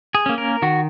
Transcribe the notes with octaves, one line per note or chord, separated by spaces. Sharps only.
G#4
A#3 C#4
A#4
D#3 F#4